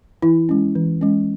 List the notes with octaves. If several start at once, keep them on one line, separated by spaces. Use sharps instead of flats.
E3 E4
G#3 C#4
E3
G#3 C#4